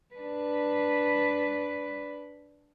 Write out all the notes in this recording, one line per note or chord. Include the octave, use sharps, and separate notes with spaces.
D4 B4